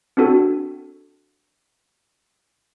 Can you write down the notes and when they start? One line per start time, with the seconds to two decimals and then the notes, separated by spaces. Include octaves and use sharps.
0.17 C4 D4 F#4 A4